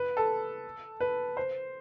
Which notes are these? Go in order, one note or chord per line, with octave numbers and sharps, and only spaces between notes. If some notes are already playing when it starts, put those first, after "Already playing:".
Already playing: B4
A4
B4
C5